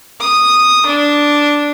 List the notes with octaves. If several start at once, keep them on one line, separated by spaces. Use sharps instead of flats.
D#6
D4